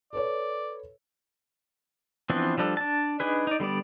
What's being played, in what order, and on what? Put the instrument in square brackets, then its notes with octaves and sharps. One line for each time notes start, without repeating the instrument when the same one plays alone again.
[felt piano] A4 B4 C#5 [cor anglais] D5
[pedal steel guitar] E3 F3 B3 C4 D4
F3 G3 D4 A4
D4 A5
D4 D#4 G#4 B4
D#4 D5
D3 G3 B3 D5